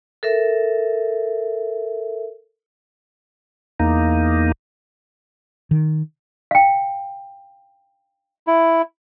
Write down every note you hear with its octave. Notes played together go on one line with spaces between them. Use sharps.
A4 A#4 E5
E2 A#3 D#4
D#3
F5 G5
E4